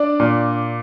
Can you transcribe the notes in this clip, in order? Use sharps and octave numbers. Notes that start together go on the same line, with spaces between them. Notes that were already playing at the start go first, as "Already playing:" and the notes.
Already playing: D4 D5
A#2